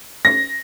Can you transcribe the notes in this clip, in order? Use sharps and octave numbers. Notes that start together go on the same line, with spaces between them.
A#6